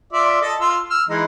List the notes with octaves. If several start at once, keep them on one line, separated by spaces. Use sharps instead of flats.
F4 D5 E5
A4 D#5 A5
F4 E6
E6 F6
E3 G#3 D#4